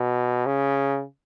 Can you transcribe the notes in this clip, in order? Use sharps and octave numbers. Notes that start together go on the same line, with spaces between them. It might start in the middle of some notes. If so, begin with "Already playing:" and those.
Already playing: B2
C#3